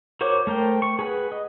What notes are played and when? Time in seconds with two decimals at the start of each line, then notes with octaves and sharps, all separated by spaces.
0.21 F#4 A#4 C5 C#5 D6
0.47 A3 A#4 C5 G5
0.82 C#6
0.99 G#4 B4 F#5
1.32 D#5